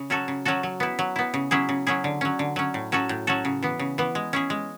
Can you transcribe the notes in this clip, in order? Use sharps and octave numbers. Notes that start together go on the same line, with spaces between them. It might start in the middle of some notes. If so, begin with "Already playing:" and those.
Already playing: C#3
F#3 C#4 F#4 A4
C#3
F#3 C#4 F#4 A4
F#3
B3 E4
F#3
B3 E4
C#3
F#3 C#4 E4 G#4
C#3
F#3 C#4 E4 G#4
D3
F#3 C#4
D3
F#3 C#4
A2
F#3 C#4 F#4 A4
A2
F#3 C#4 F#4 A4
C#3
E3 B3
C#3
E3 B3
G#3
C#4 E4 G#4
G#3